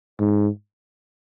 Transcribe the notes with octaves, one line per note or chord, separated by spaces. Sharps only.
G#2